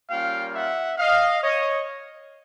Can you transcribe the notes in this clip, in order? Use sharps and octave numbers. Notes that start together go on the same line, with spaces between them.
G3 A#3 C#4 F4 F5 G5
E5 F#5
D#5 F5
C#5 D#5